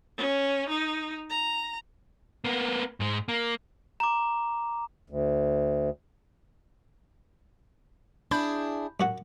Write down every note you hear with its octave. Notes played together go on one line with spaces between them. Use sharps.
C#4
D#4
A#5
A#3 B3
G#2 G#3
A#3
A#5 D6
D2
D4 E4 G#4 B5 G6
F#2 F#4 F#5